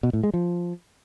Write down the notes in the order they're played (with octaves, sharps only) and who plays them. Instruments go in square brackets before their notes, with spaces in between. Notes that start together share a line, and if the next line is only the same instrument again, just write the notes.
[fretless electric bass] B2
A2
G#3
F3